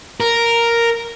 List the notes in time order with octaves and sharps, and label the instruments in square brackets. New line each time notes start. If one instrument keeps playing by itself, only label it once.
[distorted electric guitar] A#4